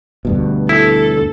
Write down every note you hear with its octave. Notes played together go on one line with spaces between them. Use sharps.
D2 G2 B2
E4 A4